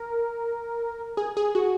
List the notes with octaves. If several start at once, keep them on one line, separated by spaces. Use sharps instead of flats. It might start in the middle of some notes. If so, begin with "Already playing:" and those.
Already playing: A#4
G#4
G#4
F#4